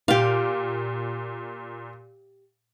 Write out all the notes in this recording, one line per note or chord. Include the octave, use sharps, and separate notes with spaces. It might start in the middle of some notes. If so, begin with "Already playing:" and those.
A#2 G4 F5